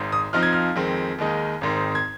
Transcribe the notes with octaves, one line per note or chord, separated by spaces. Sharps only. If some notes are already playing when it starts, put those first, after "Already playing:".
Already playing: G#1 G#2
D#6
F2 F3 C4 D#4 F6
G#6
F6
F2 D#3 G#3 C4
D#2 D#3 G#3 D#4
G#1 G#2 D#3 C4
G#6